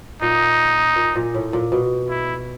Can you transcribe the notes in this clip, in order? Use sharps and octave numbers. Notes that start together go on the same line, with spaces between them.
A#2 D#4
A#2
A#2
A2
A#2
B2
E4